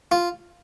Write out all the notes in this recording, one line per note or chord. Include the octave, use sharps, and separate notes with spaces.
F4